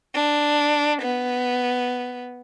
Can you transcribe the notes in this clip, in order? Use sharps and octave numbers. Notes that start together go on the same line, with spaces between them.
D4
B3